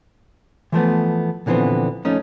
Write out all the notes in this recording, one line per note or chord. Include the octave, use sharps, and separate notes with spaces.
E3 F3 A3 B3
A#2 D3 E3 F3 B3 C4
F3 A3 C#4 D#4